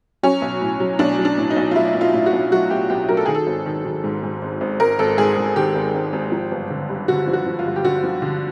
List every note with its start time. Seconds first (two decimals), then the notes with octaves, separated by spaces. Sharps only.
0.23 F#3 C#4
0.42 B1
0.61 A2
0.80 F#3
0.99 B1 D4
1.19 F#3
1.25 D4
1.38 A2
1.50 D#4
1.56 B1
1.71 F4
1.76 F#3 E4
1.95 B1
2.01 F4
2.14 A2
2.26 F#4
2.33 B1
2.51 F#3 F#4
2.70 B1 G4
2.90 B1 G4
3.09 F#3 A#4
3.17 A4
3.26 D#3 G#4
3.35 A4
3.47 G#1
3.66 D#3
3.85 D#3
4.04 G#2
4.23 G#2
4.42 G#1
4.61 G#1
4.80 G#1 A#4
4.99 G#1 A4
5.18 G#2 G#4
5.37 G#2
5.56 D#3 G4
5.75 G#1
5.94 G#1
6.13 G#1
6.32 F3
6.51 G1
6.70 D3
6.89 G2
7.08 D3 F#4
7.27 F3
7.33 F#4
7.46 F3
7.59 F4
7.65 G2
7.76 G4
7.84 D3 F#4
8.04 F3
8.22 D3